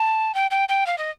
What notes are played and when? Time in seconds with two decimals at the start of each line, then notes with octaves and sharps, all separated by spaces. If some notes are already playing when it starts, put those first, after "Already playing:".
Already playing: A5
0.35 G5
0.51 G5
0.69 G5
0.86 F5
0.98 D#5